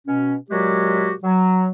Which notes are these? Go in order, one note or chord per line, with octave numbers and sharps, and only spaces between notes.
B2 C#4
A#2 F#3 G#3 F#4 G4
F#3